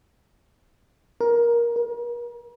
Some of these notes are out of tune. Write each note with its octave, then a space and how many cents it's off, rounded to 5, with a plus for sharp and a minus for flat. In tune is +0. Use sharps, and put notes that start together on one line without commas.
A#4 +15
A#4 +40